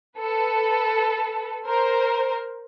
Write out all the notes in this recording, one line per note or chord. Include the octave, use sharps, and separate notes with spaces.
A4 B4
A#4 C5